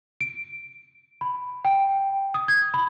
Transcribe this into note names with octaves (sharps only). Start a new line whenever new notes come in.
D7
B5
G5
D#6
G#6
B5